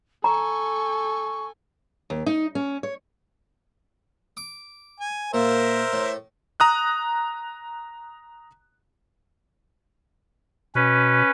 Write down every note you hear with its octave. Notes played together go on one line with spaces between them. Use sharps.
A4 G#5 A#5 C#6
D#2
D#4
C#4
C#5
D6
G#5
A#2 A#4 C5 E5
A2
A#5 D#6 F#6
B2 C#4 B4